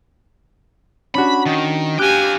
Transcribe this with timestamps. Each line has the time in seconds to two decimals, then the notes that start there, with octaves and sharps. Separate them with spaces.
1.15 C#4 D4 F#4 B5
1.46 D#3
1.99 F4 G4 G5 G#5 D6 F#6 G6